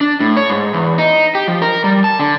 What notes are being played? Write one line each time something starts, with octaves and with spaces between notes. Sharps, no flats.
D4
A2
C#5
G#2
E2
D#4
G4
F3
A#4
G3
A5
D3